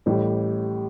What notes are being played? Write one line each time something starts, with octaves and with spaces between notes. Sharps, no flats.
A1 A2 G3